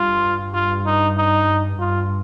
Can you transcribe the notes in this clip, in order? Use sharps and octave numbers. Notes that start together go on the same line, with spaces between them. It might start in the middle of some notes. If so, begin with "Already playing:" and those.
Already playing: G2 F4
F4
D#4
D#4
G2 F4